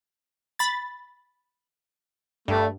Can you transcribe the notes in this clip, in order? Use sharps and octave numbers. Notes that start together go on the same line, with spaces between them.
B5 A6
G2 A3